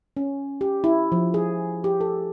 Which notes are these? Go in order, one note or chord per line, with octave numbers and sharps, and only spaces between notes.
C#4
G4
E4
F3
G#4
G4
A4